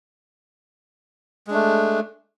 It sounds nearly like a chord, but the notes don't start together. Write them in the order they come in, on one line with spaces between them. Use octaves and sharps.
G#3 D4 A3